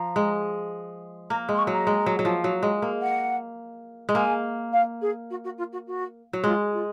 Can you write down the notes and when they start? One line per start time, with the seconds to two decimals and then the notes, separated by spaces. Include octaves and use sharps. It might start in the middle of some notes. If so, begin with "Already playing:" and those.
Already playing: F3 A#5
0.16 G#3
1.30 A#3 A#5
1.49 G#3 C6
1.58 C#6
1.67 F#3
1.73 A#5
1.87 G#3
2.06 F#3
2.19 F#3
2.25 F3
2.44 F#3
2.63 G#3
2.82 A#3
3.01 F#5
4.09 G#3
4.15 A#3 G#5
4.73 F5
5.01 G#4
5.30 F#4
5.44 F#4
5.58 F4
5.72 F#4
5.87 F#4
6.33 F#3
6.44 G#3 F4
6.72 F4